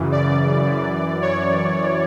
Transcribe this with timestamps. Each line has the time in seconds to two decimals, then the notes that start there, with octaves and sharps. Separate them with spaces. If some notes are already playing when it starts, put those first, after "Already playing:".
Already playing: F#2 C#3 E3
0.12 D5
0.67 F#2 E3
1.22 C#5